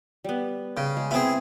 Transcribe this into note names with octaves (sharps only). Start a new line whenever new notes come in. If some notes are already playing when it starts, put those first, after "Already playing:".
G3 B3
C#3 G5
G#3
B3 C4 E4 G#4